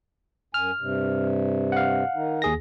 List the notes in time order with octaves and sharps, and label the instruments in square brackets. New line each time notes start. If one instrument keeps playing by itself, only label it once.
[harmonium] F#2 G#5 [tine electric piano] F6
[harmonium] G2 C3
[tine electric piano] F5 F#5
[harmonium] D#3 D#4
[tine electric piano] D#2 G#4 A#6